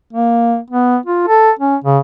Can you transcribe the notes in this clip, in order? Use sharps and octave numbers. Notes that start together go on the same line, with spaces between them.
A#3
B3
F4
A4
C#4
C#3